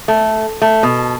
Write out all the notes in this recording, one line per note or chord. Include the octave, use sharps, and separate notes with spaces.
A3
A3
B2